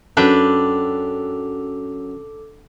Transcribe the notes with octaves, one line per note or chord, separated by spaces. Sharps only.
F#2 D4 A4 B4 G5 D6